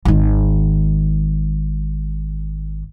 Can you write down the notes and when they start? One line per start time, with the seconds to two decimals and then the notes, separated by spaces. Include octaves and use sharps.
0.05 G#1 D#3